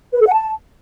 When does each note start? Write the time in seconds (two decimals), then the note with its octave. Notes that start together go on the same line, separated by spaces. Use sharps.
0.14 B4
0.20 A4
0.27 F#5
0.33 A5